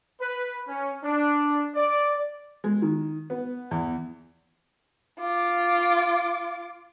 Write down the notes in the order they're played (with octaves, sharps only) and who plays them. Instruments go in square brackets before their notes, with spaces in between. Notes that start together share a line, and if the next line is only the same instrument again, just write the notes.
[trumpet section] B4
C#4
D4
D5
[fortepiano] G#3
D#3
B3
E2
[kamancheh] F4 D6